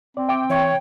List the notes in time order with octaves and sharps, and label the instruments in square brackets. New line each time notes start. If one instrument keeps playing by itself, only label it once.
[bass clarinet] C4 [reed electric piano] D5
[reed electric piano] E5 D6 [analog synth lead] G5
[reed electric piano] E3 E5 C#6 [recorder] C#5